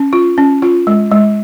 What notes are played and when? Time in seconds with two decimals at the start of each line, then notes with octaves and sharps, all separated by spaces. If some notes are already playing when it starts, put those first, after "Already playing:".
Already playing: C#4
0.13 F4
0.38 C#4
0.62 F4
0.87 G#3
1.11 G#3